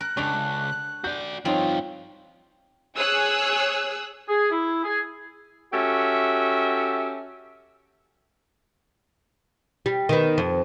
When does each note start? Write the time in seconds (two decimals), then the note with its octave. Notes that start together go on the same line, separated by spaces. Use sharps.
0.01 A#4 F#6
0.17 C#2 D4 A4 C#6 F7
1.04 F#4 D5 G6
1.45 G2 F3 C4 D#4 F4 C#5
2.96 G#4 C#5 D#6 E6 F#6
4.29 G#4
4.51 E4
4.84 G#4
5.73 C#4 F#4 G4 A4 E5
9.86 G3
10.09 D#3 B3
10.38 F2